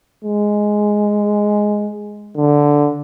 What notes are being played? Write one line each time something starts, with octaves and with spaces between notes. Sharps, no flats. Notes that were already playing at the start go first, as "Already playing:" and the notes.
G#3
D3